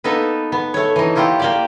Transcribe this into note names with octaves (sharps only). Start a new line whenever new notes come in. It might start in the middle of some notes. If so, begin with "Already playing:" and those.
A#3 B3 D#4 A4 B4
B3
A3 C#5
E3 D#4
A#3 E4 F4 G4 F#5
A#3 G4 D5